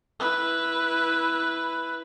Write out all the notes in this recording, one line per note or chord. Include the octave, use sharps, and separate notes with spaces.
E4 B4